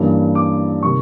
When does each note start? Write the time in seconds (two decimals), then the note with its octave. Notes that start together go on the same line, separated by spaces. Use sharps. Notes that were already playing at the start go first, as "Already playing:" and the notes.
Already playing: G2 E3 G3 A#3 C#4
0.35 D6
0.83 C3 D#3 G3 C#6